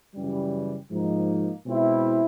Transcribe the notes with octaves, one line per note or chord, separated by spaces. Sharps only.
F#2 C#3 E3 G3
G#2 F3 A#3 D#4
B2 G#3 C4 E4